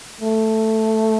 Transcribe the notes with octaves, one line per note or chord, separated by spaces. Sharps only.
A3